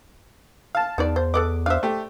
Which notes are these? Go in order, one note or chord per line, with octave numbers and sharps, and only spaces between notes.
F5 A5
E2 D#4 B4 D5
C5
A4 B4 D#5 D6
D4 C5 E5 F5
A3 G4